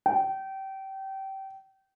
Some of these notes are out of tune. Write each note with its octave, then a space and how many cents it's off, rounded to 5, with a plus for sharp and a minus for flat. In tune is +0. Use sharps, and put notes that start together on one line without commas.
G5 -25